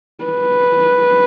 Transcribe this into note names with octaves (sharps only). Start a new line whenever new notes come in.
B4